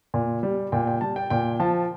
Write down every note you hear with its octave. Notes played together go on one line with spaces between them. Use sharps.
A#2
G3
A#2 G5
G5
G3 A5
G5
A#2 G5
F3 A5